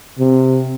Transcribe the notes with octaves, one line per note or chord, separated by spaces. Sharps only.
C3